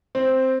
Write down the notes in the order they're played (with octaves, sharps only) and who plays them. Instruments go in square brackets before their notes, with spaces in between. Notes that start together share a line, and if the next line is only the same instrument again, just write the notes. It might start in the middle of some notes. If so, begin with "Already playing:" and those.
[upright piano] C4